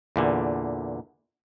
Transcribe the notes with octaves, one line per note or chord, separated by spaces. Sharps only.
E2 A#2 D3